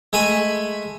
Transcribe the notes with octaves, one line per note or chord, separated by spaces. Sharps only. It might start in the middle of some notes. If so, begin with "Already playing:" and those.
G#3 A3 G#5 B5